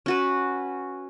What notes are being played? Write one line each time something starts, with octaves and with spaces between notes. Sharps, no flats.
C#4 F#4 B4